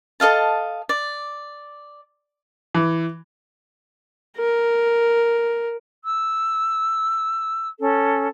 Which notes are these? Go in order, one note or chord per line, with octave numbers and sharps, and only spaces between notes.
A4 D#5 F5 A5
D5
E3
A#4
E6
C#4 A4